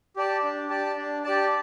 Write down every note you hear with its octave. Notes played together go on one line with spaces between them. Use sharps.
G4 D5 A5
D4
G4 D5 A5
D4
G4 D5 A5